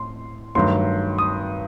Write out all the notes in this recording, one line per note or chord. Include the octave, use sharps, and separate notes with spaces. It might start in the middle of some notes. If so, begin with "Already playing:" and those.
Already playing: A2 C6
G2 D#3 F#3 A3 C6
D#6